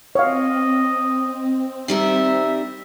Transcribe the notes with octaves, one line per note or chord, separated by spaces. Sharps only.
C4 C#5 D#5 F5
D#3 G3 A#4 E5